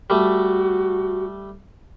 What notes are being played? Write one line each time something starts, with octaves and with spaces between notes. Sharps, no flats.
G3 A3 F#4